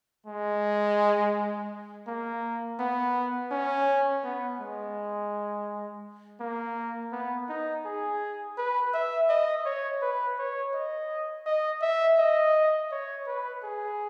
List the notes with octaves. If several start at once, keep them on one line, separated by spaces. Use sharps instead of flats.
G#3
A#3
B3
C#4
B3
G#3
A#3
B3
D#4
G#4
B4
E5
D#5
C#5
B4
C#5
D#5
D#5
E5
D#5
C#5
B4
G#4